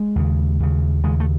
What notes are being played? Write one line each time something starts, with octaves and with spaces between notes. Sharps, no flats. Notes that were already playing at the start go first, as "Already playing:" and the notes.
Already playing: G#3
D#2 C#3
D#2 C#3
D#2 C#3 G#3
A3